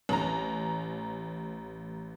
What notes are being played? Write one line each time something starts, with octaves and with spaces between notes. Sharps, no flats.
A1 A#5